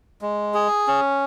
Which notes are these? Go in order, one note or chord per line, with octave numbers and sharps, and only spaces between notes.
G#3
G#4
C#4